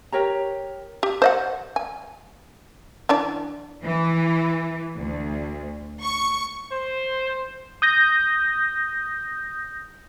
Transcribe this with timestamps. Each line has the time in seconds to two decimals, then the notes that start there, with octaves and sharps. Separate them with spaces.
0.12 G4 A#4 C#5 A#5
1.03 G4
1.22 C5 D#5 F#5
1.76 G#5
3.09 E3 D4 D5
3.84 E3
4.97 D2
6.01 C#6
6.72 C5
7.82 D#6 G6 A#6